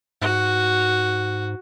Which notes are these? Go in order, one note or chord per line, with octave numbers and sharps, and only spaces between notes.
G#2 F#4